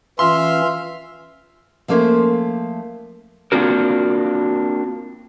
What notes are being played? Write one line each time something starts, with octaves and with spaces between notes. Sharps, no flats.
E3 C#4 F4 E5 F5 C6
F3 A3 A#3 C#4 C5
A#3 C4 D4 F4 F#4 A#4